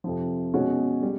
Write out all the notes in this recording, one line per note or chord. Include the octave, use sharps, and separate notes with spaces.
F2 C3 F3
B2 G#3 C#4 F#4
G3